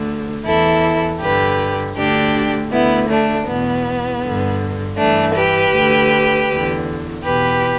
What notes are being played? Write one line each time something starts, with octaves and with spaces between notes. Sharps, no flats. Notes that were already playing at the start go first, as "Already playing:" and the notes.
Already playing: D2 D3
E2 E3 E4 A4
G2 D3 G4 B4
D2 D3 D4 G4
D2 D3 B3 E4
A3 D4
E2 B2 B3
G2 D3
G2 E3 A3 D4
G4 B4
D2 D3
E2 D3
E2 B2 G4 B4